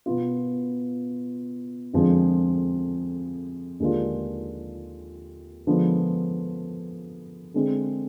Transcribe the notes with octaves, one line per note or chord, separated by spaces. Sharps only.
B2 B3 F4
F2 D3 F3 G#3
D#2 D3 G#3 D4 F4
D3 F3 G#3 B3
D3 G#3 C4